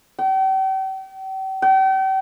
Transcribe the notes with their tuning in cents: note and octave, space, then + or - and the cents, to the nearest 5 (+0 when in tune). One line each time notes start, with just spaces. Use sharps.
G5 -40
G5 -40